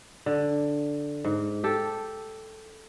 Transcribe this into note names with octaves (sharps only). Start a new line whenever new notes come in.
D3
G#2
G4 A4